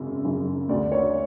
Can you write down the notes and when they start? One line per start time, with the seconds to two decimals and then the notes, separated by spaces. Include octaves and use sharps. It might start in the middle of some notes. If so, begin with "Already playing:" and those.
Already playing: G#1 F#2 C#3
0.24 F#2 C#3
0.69 D2 D5
0.92 C#5